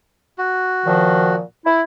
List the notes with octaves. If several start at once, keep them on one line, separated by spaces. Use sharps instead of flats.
F#4
A#2 D#3 F3
E4